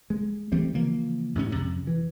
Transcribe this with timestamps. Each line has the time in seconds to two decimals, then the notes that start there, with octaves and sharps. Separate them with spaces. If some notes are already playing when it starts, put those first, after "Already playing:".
0.10 G#3
0.52 E3 G3 A3 C4
0.73 C#3 E3 F3 A#3
1.35 A1 G#2 C4 C#4
1.54 F2 C3
1.87 E3